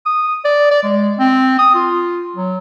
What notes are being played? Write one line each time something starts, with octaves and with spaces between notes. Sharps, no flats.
D#6
D5
D5
G#3
C4
D#6
F4
F#3